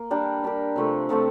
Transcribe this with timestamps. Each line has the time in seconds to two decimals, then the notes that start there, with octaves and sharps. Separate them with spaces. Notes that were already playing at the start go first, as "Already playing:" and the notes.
Already playing: A#3
0.11 G3 D4 G4 A#4
0.43 G3 D4 G4 A#4
0.76 C3 F3 A3 C4
1.09 C3 F3 A3 C4